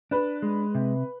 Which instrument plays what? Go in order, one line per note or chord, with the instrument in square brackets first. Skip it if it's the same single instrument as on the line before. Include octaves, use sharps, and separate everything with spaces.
[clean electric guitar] D4 [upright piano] B4
[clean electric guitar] G#3
C3